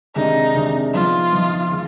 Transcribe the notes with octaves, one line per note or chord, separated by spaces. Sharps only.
C3 D#3 G#3 D4 D#4
C3 D#3 G#3 D4
F3 B3 D#4 F4
F3 B3 D#4
D#3 G#3